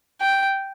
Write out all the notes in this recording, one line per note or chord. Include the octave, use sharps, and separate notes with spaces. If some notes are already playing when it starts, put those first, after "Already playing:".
G5